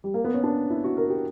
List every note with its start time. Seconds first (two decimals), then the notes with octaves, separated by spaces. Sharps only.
0.04 G3
0.14 A#3
0.24 B3
0.34 C#4
0.44 D4
0.70 E4
0.84 F#4
0.97 A#4
1.10 G4